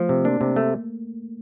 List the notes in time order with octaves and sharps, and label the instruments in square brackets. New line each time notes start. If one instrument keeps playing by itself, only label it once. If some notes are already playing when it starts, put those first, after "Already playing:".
Already playing: [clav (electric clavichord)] F3 [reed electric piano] A3
[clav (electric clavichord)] C3
[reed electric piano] A#3 [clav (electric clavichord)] D4
[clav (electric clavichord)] C3
A3